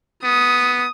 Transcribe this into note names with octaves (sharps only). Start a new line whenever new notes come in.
B3 D#6